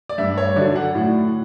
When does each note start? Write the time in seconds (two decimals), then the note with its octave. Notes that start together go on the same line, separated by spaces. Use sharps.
0.09 D5
0.18 G2 E5
0.38 C#5
0.56 D3 F#3 D5
0.76 F#5
0.95 A2